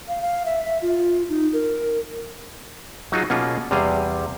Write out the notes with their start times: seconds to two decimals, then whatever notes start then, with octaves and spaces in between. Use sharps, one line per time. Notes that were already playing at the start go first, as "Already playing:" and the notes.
0.08 F5
0.22 F5
0.46 E5
0.65 E5
0.82 F4
1.29 D#4
1.53 A#4
3.12 F#3 D#4 F4 F#4 G#4
3.30 B2 A#3 C#4 F4 G#4
3.71 E2 C3 G3 G#4 F5